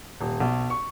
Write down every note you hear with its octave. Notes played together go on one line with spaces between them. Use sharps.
D#1
B1
C#6